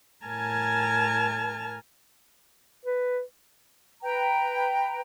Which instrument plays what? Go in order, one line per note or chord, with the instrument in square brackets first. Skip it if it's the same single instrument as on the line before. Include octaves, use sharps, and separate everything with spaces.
[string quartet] A2 A#4 G#5 A5 F6 G#6
[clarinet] B4
[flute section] B4 G5 A#5